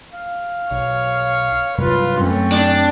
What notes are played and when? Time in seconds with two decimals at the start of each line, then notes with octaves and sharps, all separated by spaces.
0.12 F5
0.71 B1 C#5
1.78 G2 C3 F#3 G3 F4 B4
2.20 F#2 F#3 A3 C4 C#4
2.52 D4